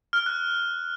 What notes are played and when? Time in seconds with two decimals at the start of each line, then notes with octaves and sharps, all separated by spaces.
0.13 F6
0.26 F#6